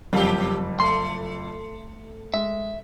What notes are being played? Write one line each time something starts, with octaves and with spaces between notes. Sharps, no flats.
F#1 F2 B2 G3 G4
A3 C6
G#3 E5